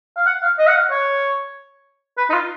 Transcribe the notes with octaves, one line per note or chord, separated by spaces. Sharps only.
F5
F#5
F5
D#5
F#5
F5
C#5
B4
D#4
F4